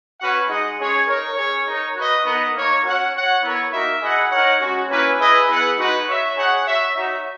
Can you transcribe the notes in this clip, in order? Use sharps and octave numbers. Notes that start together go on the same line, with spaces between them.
C#4 F#4 B4 F#5
G#3 D#4 G#4 D#5 F#5
G#3 C#4 G#4 C#5
D#4 A#4 C#5
C#4 G#4 C#5
D#4 A#4 C#5
F#4 B4 D#5
B3 D#4 A#4 D#5 F#5
A#3 D#4 A#4 C#5
C#4 F#4 C#5 F#5
F#4 C#5 F#5
B3 E4 A#4 C#5
A#3 D#4 F#4 A#4 E5
E4 G#4 D#5 F#5
D#4 A#4 C#5 F#5
G#3 C#4 F#4
A#3 C#4 E4 B4
E4 G#4 B4 D#5
B3 E4 G#4 B4 F#5
G#3 D#4 F#4 B4 F#5
F#4 C#5 E5
D#4 G#4 C#5 F#5
F#4 C#5 E5
D#4 F#4 C#5 E5